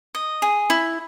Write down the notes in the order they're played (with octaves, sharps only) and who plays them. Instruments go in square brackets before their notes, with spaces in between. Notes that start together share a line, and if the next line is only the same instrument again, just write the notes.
[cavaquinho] D#5
G#4
E4